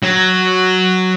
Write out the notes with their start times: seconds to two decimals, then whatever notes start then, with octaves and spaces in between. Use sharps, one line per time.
0.03 F#3